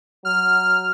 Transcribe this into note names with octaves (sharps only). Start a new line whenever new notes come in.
F#3 F6